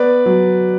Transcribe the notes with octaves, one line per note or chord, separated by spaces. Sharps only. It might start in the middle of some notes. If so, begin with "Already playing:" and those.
Already playing: B3 B4 D5
F#3